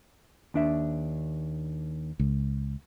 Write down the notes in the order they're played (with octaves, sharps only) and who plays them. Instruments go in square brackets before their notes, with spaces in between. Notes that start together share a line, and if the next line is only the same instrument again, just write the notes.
[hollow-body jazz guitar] D#2 D4 E5
[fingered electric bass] C#2